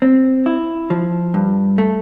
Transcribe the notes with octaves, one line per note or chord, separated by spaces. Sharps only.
C4
E4
F3
G2
A3